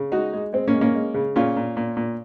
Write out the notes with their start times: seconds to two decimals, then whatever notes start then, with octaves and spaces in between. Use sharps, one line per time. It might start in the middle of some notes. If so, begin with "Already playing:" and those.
Already playing: C#3
0.12 G#3 D#4 F#4
0.33 G#3
0.53 G#3 C4
0.68 A#3 C#4
0.73 G#3
0.81 A#3 C#4
0.95 G#3
1.14 C#3
1.36 A#2 C#4 F4
1.56 A#2
1.77 A#2
1.97 A#2